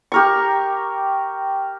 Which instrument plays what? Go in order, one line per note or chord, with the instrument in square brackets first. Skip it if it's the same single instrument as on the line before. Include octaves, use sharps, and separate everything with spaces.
[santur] G4 A#4 C#6